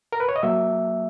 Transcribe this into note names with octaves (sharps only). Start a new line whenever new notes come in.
A#4
B4
C#5
D#5
F#3 A#3 E5